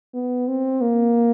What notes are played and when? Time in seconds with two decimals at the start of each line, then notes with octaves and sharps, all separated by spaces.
0.14 B3
0.48 C4
0.82 A#3